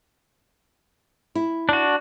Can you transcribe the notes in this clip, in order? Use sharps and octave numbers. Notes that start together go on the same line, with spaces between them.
E4
D4 F#4